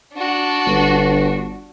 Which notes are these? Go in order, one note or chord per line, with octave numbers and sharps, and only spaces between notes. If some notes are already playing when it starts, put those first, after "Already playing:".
D4 F#4
G1